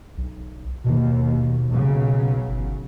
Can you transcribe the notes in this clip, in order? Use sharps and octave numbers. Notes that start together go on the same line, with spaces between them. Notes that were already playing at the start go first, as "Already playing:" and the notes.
B1
D#2 B2
B1 C#3 F#3
G1